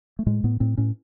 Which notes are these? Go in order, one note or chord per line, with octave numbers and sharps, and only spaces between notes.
A3
A2 G#3
A2 B3
A2 C4
A2 C#4